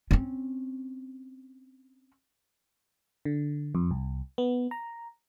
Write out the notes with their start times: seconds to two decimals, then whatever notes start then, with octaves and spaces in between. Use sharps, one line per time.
0.11 C4 C#4
3.25 D3
3.75 F2
3.91 C2
4.38 B3
4.71 A#5